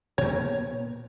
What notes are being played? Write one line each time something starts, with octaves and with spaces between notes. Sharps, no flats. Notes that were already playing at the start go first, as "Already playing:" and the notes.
A#2 A#3 B3 C#5